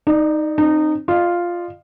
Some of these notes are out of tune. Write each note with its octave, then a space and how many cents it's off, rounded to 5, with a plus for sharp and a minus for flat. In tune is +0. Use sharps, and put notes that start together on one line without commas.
D#4 +0 D5 +30
C4 +25 D#4 -20
F4 +0 D#5 -40